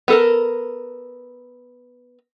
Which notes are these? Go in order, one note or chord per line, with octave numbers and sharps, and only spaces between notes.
B3 A4 A#4